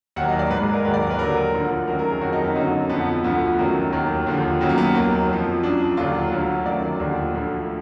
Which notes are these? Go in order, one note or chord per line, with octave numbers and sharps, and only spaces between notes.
D#2 D#3 F#3 F#5
D#5
D5
G#2 F#3 B4
G#4
A#4
D#2 D#3 F#3 B4
D5
A#4
B4
D#2 D3 F#3 A#4
D2 D3 F3
F#2 D#3 F#3 A#4
A#4
G#4
F2 D#3 F#3 F#4
D#4
B3
F#2 D3 F#3 D#4
F2 D3 F3 B3
D2 D3 F3 B3
F#2 D#3 F#3
D#2 D#3 F#3
D#2 D3 F3
F#2 D#3 F#3 B3
A#3
B3
D#2 D#3 F#3
F2 F3
F#2 F3 D4
D#2 D3 F#3 F4
D2 D3 F#3
F#2 D#3 F#3 D5
D#2 D3 F3
D2 D3 F3